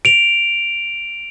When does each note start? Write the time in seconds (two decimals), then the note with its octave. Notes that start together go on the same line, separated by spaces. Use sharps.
0.05 D7 F7